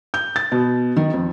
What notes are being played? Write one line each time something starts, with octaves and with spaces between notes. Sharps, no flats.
G6
A6
B2
D#3
F2